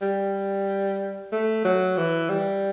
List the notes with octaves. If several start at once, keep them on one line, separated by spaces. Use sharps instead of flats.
G3
A3
F#3
E3
G3